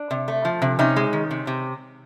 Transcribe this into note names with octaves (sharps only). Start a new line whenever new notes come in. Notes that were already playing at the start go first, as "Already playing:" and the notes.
Already playing: D4
C3
A3
F3
C3
C3 C#4 D#4
G#3
D#3
C3
C3